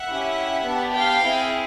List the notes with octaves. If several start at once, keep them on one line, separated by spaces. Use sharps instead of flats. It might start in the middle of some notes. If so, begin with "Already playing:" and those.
Already playing: E5 F#5
C#4 E4 G4
B3 D4 G4
F5 G5
C4 E4 G#4